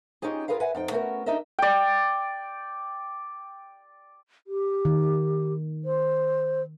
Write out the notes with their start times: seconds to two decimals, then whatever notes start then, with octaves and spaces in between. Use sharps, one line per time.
0.22 C#4 D#4 F4 G4 G#4
0.48 F4 F#4 G#4 A#4 B4 F5
0.60 B4 E5 F#5 G#5
0.75 F2 D#4 G5
0.91 A3 B3 C#4 F#4 G4 A#4
1.26 D4 D#4 G4 A#4 D#5 E5
1.59 D5 G5
4.47 G4
4.85 D#3
5.85 C5